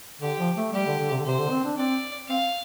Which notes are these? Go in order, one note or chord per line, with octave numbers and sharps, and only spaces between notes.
D3 G4
F3
A3
G3 G4
D3
D3
C3
D3
C3 C5
D3
C4
D4
C4 D5
C4 F5